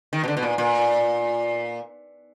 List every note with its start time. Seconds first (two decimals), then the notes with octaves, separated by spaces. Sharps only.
0.13 D#3
0.24 B2
0.28 D3
0.37 B2
0.43 A#2
0.58 A#2